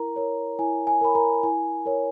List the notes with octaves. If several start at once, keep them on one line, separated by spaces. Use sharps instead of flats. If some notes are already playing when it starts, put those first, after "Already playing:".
Already playing: E4 A#4 A#5
A#4 C#5
E4 G#5
G#5
A#4 C#5 B5
A#4 A#5
E4 G#5
A#4 C#5